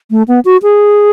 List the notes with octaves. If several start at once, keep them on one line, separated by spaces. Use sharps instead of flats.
A3
B3
F#4
G#4